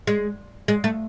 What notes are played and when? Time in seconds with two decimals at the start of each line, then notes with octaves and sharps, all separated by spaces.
0.07 G#3
0.68 G#3
0.84 A3